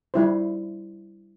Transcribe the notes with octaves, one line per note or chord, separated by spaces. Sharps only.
G3 E4 C5